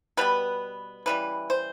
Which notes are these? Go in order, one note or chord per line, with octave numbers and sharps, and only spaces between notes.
B2 G3 B3 B4
C#3 E3 G3 B4
C5